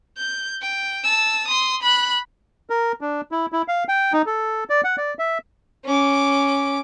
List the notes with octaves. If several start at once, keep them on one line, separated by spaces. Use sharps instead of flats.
G6
G5
A5 E6
C6 D#6
B5 F#6
A#4
D4
E4
E4
F5
G5
D#4
A4
D5
F#5
D5
E5
C#4 D6